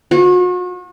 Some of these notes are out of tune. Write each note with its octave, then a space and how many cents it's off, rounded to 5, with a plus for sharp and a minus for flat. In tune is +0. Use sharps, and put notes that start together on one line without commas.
F#4 -40